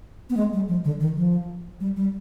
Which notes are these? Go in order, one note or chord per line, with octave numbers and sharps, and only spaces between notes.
B3
G#3
G3
F3
D3
D#3
F3
G3
G3